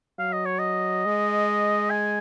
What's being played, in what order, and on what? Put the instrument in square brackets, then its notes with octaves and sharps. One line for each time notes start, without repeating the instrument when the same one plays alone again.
[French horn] F#3 [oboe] F5
[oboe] D#5
C#5
D#5
[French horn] G#3
[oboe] G#5